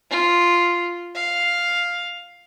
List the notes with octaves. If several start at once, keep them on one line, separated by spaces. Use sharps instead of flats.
F4
F5